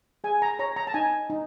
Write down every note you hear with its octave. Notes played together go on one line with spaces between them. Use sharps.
G#4 G#5
A#5
C#5 A#5
A#5
A5
D#4 G#5
D#4